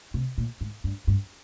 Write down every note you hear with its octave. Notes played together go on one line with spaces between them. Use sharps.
C3
A#2
G#2
G2
G2